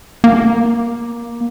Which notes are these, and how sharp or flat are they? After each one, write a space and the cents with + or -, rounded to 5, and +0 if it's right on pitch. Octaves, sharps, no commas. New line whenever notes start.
A#3 +15